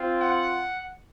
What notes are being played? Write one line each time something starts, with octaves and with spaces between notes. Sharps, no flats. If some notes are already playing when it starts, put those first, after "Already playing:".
Already playing: C4 F4
F#5